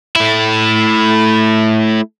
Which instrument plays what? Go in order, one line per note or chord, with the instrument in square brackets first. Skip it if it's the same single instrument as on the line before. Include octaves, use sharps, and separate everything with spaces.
[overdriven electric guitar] A3 E4